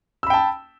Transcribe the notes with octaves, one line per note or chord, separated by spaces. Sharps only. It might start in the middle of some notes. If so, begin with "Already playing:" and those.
G5 A5 B5 E6